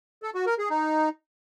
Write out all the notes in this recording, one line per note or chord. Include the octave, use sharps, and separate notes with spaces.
A4
F#4
A#4
G#4
D#4